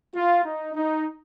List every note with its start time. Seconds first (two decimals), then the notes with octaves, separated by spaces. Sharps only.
0.15 F4
0.45 D#4
0.74 D#4